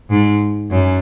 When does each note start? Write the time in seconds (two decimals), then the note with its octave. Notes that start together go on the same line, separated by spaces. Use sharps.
0.10 G#2
0.71 F#2